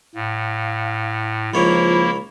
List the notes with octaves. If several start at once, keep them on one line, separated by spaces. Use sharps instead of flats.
A2 F5
C#2 D#3 F3 A#3 E4 C#5 B5